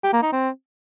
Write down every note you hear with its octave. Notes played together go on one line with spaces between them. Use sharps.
G4
A#3
D#4
C4